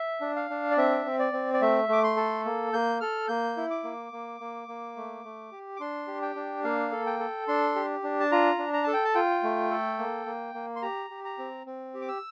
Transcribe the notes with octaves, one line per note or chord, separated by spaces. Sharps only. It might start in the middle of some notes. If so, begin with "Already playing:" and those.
Already playing: E5
D4
F5
D4
D5
C4 E5
C4
D5
C4
D5
A3 E5
A3 D6
C6
A4
A#3
A#3 G6
A4 F6
A#3 G6
E4
D6
A#3
A#3
A#3
A#3
A3
A3
G4
D6
D4 C6
G4
G5
D4
A#3 F5
A4
G5
A4
D4 C6
G4
D4
A5
F4 A#5
D4
A#5
A4 A5
G5
A5
F4 G5
A3
A4
A#3
A#3
A#3
C6
G4 A#5
G4
A#5
C4
C4
G4
D6
E6